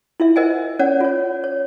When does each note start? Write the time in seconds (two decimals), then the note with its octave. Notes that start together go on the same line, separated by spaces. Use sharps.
0.20 E4 F4 E5
0.36 A#4 C5 D#5 E5 F#5 G#5
0.79 C#4 C#5 D5 F#5
1.01 F4 C#5
1.44 C#5